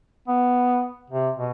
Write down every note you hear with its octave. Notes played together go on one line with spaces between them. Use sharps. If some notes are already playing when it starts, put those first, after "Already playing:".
B3
C3
B2